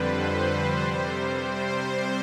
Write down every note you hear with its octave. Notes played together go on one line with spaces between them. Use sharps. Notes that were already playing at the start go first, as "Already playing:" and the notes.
Already playing: F2 D3 G3 B4 C5
C3 G3
C5
C5